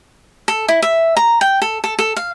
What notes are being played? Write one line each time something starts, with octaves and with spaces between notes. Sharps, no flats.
A4
E4
E5
A#5
G5
A4
A4
A4
F5